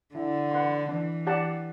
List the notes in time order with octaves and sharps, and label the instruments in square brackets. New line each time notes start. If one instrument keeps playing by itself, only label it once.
[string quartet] D3 [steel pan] E4
[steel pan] B4 F#5 C6
[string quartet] E3 [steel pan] D4
[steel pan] G4 D5 F#5 A5